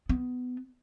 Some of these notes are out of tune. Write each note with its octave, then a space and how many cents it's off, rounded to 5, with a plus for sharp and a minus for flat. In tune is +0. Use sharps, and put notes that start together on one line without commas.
B3 +20